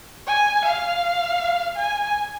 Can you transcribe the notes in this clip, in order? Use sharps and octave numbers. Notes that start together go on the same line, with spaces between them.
G#5
F5
G#5